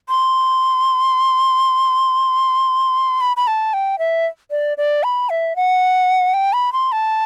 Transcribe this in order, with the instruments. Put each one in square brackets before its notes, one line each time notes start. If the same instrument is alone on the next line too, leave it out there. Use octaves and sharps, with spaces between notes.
[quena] C6
B5
B5
A5
G5
E5
D5
D5
B5
E5
F#5
G5
B5
C6
A5